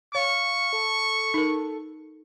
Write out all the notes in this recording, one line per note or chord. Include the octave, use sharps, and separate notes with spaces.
C#5 F5 C#6
A4
D#4 A#4